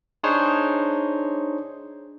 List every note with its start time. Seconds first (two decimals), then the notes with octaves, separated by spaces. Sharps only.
0.23 D4 D#4 G#4 C5 C#5